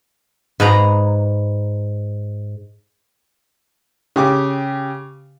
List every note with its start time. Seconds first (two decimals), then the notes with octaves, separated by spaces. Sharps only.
0.60 G#2 B4 A#5
4.16 C#3 G4 D6